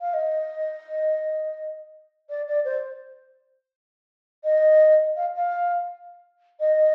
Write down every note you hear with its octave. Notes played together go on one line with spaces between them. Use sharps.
F5
D#5
D5
D5
C5
D#5
F5
F5
D#5